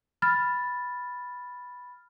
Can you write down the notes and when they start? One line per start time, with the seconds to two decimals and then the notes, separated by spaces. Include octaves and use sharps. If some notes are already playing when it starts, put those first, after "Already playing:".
0.22 B5 F6 A6